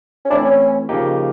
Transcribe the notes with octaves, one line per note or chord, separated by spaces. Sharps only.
C#4
E3 A3 C4 D4 E4
C#4
C#3 F3 A#3 D#4 G4